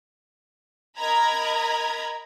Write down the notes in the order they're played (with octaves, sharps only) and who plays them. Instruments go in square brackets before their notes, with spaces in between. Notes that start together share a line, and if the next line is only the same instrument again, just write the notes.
[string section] A#4 D#5 A#5 B5 G#6